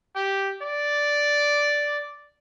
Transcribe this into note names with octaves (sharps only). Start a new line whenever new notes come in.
G4
D5